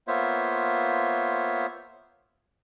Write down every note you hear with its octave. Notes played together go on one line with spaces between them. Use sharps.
A#3 B3 F4 C5 C#5 E5